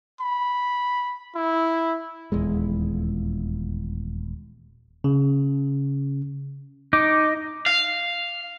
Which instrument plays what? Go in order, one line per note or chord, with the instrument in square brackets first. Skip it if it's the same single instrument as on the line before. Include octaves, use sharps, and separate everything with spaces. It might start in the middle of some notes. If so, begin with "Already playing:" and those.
[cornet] B5
E4
[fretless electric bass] D#1 E2 G#3
[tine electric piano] C#3
[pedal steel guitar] D#4 [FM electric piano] D6
[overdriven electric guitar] F5